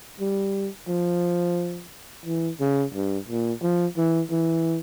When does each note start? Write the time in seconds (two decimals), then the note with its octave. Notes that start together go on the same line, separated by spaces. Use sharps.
0.20 G3
0.88 F3
2.26 E3
2.60 C#3
2.94 G2
3.28 A#2
3.62 F3
3.97 E3
4.31 E3